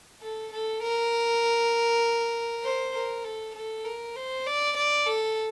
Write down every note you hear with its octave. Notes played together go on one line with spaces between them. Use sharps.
A4
A4
A#4
C5
A#4
A4
A4
A#4
C5
D5
D5
A4